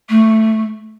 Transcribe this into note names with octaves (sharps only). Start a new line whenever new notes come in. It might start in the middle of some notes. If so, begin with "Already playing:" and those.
A3